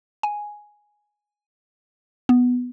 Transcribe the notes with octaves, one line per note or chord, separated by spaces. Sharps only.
G#5
B3